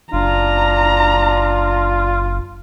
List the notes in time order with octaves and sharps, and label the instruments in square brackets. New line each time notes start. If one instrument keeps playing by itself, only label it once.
[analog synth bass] F#1 [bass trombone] D4 [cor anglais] F4 [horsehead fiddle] A#5